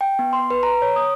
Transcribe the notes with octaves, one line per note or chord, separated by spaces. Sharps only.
G5
B3
C6
B4
A#5
C#5
D#6